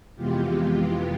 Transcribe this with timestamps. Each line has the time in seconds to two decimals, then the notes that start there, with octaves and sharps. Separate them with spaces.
0.16 F2 C3 E3 G#3 B3 F4 G4
0.63 F4